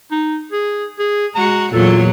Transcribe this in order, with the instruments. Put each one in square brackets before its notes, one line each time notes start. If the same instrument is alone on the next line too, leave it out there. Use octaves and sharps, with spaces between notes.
[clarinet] D#4
G#4
G#4
[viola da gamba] G#3 F#4 [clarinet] A#5
[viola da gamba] E2 A#2 F#3 [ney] F4 [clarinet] A4